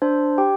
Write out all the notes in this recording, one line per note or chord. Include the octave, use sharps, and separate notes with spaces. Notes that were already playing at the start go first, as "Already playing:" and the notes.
D4 C5
G4 G5